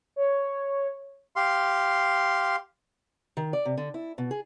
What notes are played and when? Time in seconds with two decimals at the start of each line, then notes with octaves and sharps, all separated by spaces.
0.16 C#5
1.36 G4 F5 C6
3.37 D#3
3.53 D5
3.65 C3
3.77 D3
3.94 E4
4.18 B2
4.31 G#4